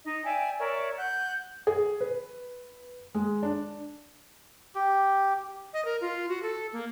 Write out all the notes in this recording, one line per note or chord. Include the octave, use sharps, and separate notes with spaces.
D#4 D#5
D5 E5 G5 G#5
A#4 C#5 D5 E5
F#5 F#6 G6
G#4
B4
G#3
D4
G4
D#5
A#4
F4
F#4
A4
A#3